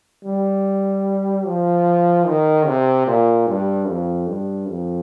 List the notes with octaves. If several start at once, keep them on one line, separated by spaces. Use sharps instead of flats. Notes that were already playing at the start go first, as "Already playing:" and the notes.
G3
F3
D#3
C3
A#2
G2
F2
G2
F2